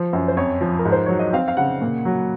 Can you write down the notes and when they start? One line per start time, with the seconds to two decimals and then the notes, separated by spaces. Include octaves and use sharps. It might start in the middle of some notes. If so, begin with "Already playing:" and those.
Already playing: F3 C5
0.13 F#2
0.28 C5
0.37 F2 C#5
0.61 F3
0.79 A#4
0.85 G#2
0.92 C5
1.06 F#3 C#5
1.19 D#5
1.33 C4 F5
1.48 F5
1.57 C#3 F#5
1.82 A#2
2.05 F#3